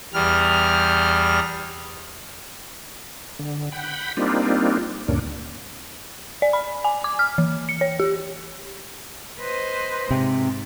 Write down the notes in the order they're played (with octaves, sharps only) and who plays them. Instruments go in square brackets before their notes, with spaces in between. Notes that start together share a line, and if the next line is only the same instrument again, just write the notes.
[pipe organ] E2 G3 F6
[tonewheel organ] D3
F#5 G5 B5
G3 A#3 C4 D4 D#4 F4
D2 G2 A#2 A#3 C#4 D4
[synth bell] D5
B5
G#5
D6
F6
E3
C#7
C#5
G4
[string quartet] B4 C5 D#5
[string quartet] G#2 [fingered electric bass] C3